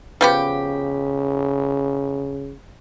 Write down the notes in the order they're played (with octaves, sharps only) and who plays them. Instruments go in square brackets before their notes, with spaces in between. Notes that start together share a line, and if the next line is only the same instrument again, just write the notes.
[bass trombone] C#3 [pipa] F3 B3 G4